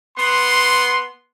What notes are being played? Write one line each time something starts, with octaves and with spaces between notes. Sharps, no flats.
B3 C6